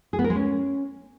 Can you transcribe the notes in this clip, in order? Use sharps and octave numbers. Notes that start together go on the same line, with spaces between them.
G#4
B3
A#4
G#3
C#4